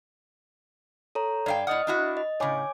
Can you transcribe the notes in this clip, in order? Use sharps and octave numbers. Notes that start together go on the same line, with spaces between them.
A4 C#5 A#5
G2 D5 F5 G5
A2 D#5 F#5 D#6 F6
D4 E4 F#4
D#5
A2 C#3 C#5 G#5 D6